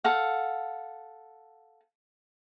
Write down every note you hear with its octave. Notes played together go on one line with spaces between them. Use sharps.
A4 F5 F#5